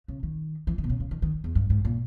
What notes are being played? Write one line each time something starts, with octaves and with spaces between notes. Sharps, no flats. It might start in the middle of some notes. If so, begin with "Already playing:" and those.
C#3
D#3
E3
D#3
B2
C#3
C#3
D#3
D#3
E2
G2
G#2
A#2